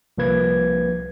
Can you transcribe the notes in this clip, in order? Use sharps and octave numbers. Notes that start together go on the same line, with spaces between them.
C2 F3 A#3 B4 G#6